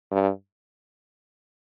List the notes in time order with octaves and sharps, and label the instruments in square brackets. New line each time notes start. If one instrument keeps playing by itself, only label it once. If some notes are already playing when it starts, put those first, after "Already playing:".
[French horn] G2